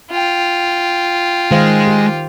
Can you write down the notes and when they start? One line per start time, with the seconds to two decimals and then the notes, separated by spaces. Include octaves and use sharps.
0.11 F4 G5
1.51 D#3 G#3 C5 F5
1.87 G4